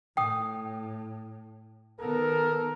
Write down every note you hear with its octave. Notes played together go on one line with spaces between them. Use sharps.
A2 G5 D#6
D#3 B3 A4 A#4